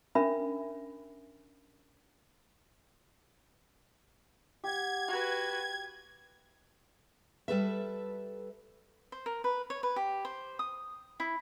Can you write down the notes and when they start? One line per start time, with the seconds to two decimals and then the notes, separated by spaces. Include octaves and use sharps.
0.15 C#4 D4 A#4 E5 B5
4.64 G4 F#5 G#6
5.08 F#4 B4
7.48 G3 A4 B4 E5
9.12 C5
9.26 A#4
9.44 B4
9.70 C#5
9.83 B4
9.96 G4
10.25 C5
10.59 D#6
11.20 E4